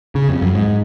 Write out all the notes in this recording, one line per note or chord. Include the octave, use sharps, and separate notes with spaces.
C#3
F2
F#2
G#2